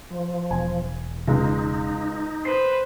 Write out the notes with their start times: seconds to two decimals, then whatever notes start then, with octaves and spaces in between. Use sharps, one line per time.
0.11 F3
0.51 E1 G#5
1.27 C#2 G#3 D#4
2.45 B4 C5 C7